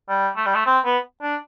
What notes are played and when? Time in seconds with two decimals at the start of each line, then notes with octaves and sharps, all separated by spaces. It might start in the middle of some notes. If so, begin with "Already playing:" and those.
0.09 G3
0.37 A3
0.46 G3
0.55 A3
0.66 C4
0.85 B3
1.22 D4